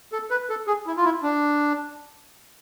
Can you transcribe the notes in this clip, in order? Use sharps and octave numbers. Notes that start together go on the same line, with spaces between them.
A4
B4
A4
G#4
E4
F4
E4
D4